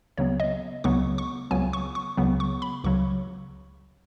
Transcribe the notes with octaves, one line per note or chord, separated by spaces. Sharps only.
C#2 C#3 F#3 B3 C#5
D#5
C#2 C#3 F#3 B3 C#6
C#6
C#2 C#3 F#3 B3 G#5
C#6
C#6
C#2 C#3 F#3 B3
C#6
B5
C#2 C#3 F#3 C#6